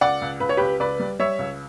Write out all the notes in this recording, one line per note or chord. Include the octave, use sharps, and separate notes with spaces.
C#2 D5 F#5
C#2
C#2 B4
C#5
C#2 G4 B4
C#2 B4 D5
G3
G3 C#5 E5
C#2